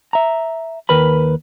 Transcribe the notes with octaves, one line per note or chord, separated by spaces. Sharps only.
E5 A#5
D#2 A#4 B4 B5